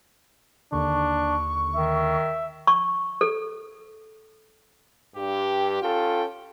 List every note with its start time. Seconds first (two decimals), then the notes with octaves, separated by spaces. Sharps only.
0.72 D#2 D3 D4 C#6
1.75 D#3 E5
2.67 C#6
3.21 A4
5.16 G2 G4
5.82 C#4 F4 A4 G5